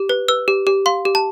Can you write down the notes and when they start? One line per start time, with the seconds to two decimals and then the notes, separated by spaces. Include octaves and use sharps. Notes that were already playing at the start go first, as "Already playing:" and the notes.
Already playing: G4
0.09 B4
0.28 B4 E6
0.48 G4
0.67 G4
0.86 F5 C6
1.05 G4
1.15 A5